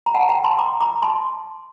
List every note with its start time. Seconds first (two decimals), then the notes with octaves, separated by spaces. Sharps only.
0.06 A#5
0.14 F#5 A5
0.29 G5 A#5
0.44 A5 C6
0.59 A#5 D6
0.81 A#5 D6
1.02 A5 C6